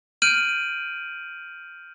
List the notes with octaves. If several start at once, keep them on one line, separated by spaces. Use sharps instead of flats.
F6 G6 D7 D#7 F#7